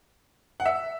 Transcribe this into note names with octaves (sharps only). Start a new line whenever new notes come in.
F#5
E5